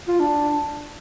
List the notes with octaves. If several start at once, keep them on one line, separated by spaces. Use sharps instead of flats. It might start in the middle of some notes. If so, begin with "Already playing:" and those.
F4
D4